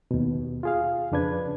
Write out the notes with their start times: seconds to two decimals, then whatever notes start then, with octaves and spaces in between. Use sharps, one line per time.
0.11 D#2 B2
0.63 F4 G#4 F5
1.12 F2 C#3 D4 B4 G#6